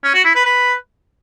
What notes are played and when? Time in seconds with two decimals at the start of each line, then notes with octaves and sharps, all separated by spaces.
0.04 C#4
0.14 F#4
0.24 E4
0.35 B4
0.45 B4